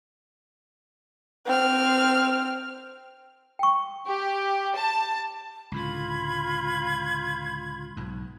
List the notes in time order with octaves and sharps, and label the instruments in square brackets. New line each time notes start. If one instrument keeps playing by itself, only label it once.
[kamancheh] C4 F6
[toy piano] G5 C#6
[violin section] G4
A5
[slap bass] C#2 A2 D3 [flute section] F4 B5 G#6
[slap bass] B1 G#2